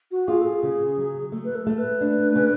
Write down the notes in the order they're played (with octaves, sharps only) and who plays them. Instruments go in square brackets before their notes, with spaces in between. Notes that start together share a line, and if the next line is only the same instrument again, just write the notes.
[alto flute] F#4
[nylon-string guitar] F4 [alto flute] G#4
[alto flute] A4
G#4
[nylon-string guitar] C#3
F#3
A3
[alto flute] B4
A4
[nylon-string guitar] A3
[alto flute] B4
[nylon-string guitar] D4
C#3